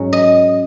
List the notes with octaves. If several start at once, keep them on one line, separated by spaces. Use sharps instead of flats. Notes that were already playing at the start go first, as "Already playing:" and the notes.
Already playing: G#2 F#3 C#4
D#5